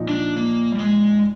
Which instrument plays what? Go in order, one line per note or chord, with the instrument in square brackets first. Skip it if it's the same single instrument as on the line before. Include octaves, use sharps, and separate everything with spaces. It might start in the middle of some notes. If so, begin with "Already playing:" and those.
Already playing: [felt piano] A#2 F3 D#4
[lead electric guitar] D4
A#3
G3
G#3